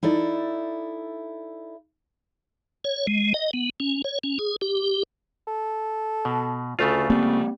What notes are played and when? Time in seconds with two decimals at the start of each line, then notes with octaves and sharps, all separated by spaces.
0.03 D#4 E4 A4 D5
2.84 C#5
3.07 G#3
3.34 D#5
3.53 B3
3.80 C#4
4.04 C#5
4.24 C#4
4.39 G#4
4.61 G4
5.47 A4
6.25 B2
6.79 D2 C#3 A3 F4
7.10 G3 A#3 C4